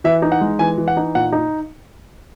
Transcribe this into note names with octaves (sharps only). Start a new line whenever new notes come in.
E3 E5
D#4
F#5
G#3
E3 G#5
E3
F#5
D#4
A#2 F#5
D#4